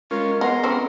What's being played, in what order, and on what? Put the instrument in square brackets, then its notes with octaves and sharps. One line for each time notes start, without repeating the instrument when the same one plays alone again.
[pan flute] G#3 [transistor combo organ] C#4 F4 [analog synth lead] A#4
[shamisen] G#3 [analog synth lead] B3 [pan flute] F#5 [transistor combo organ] A#5 C6
[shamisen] C#3 E3 C4 [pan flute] A4